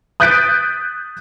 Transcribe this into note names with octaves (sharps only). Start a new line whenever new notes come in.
D#6 F#6 G6 A6 B6 D7